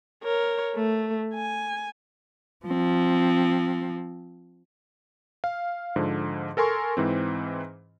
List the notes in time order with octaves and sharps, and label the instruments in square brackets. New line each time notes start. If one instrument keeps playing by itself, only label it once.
[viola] A#4 C#5
A3
G#5
[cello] F3 C4
[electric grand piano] F5
G#2 D3 F3
A4 A#4 G#5 C6 C#6
G#2 E3 C4